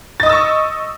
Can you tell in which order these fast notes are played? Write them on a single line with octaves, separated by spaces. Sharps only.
A6 D#5 D#6 E6 C#6